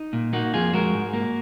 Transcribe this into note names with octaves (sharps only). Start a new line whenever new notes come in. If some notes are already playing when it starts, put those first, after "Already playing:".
Already playing: D#4
A#2
A#3 D#4 F#4
F2 F4 G#4
G#3 F#4 A#4
G#2
A#3